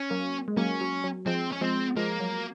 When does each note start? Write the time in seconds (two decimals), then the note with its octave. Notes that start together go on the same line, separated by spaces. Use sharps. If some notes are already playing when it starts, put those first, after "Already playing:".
Already playing: C#4
0.10 F#3 A#3
0.48 G#3
0.57 F#3 A#3 C#4
0.81 F#3
1.04 F#3
1.26 F3 G#3 C4
1.52 C#4
1.61 F3 G#3 C4
1.96 F3 G#3 A#3
2.20 F#3